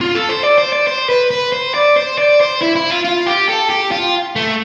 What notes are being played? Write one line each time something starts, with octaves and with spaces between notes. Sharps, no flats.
F4
A4
C5
D5
C5
D5
C5
B4
B4
C5
D5
C5
D5
C5
E4
E4
F4
F4
G4
A4
G4
F4
A3